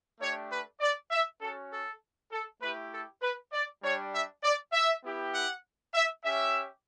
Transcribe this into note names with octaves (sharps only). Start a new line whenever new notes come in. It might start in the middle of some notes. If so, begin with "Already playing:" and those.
A3 D4 G4 C#5
B4
D5
E5
C#4 F#4 A4
A4
A4
A3 E4 G4 B4
A4
B4
D5
G3 D4 G4 C#5
E5
D5
E5
B3 E4 G4
F#5
E5
C#4 G4 E5